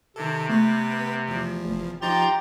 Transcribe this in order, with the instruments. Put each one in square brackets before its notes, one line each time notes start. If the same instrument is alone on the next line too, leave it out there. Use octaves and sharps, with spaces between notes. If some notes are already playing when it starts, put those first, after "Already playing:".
[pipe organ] C3 [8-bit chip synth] D#3 A4
[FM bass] A3 [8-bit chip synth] B3 B4
[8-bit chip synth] E2 F3
[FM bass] F1
[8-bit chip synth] F3 D#4 [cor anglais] G4 [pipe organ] A#5 C6 A6